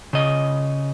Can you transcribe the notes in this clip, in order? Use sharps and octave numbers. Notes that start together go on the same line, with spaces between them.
C#3 D#5